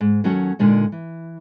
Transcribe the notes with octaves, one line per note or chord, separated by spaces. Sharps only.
G#2
D#2 F#3 C#4 F#4 A4 F#5
A#2 D3 G#3 D#4
E3